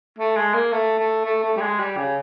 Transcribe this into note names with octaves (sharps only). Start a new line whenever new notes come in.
A3
G#3
A#3
A3
A3
A3
A3
G3
G#3
G3
C#3